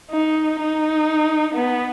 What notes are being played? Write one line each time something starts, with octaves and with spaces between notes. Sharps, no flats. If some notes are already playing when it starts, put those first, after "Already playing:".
D#4
D#4
B3